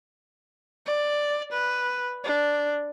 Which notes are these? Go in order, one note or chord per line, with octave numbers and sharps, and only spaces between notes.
D5
B4
D4